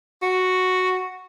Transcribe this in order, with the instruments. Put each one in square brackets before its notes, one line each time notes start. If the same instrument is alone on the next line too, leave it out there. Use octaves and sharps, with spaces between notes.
[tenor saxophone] F#4